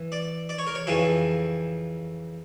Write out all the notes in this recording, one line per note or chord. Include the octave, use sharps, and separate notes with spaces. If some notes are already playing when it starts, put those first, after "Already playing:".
Already playing: E3
D5
D5
C#5
A#4
C#5
F2 C#3 E3 A4